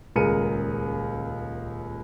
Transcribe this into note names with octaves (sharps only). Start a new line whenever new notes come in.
D#1 C#2 G#4 A#4 C#7 D#7